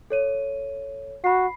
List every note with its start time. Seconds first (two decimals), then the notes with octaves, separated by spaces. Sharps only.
0.10 A4 C#5 D#7
1.24 F#4 B5 C7